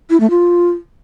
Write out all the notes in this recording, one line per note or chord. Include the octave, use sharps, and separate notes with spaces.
E4
A3
F4